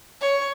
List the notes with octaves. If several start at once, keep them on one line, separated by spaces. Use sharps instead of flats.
C#5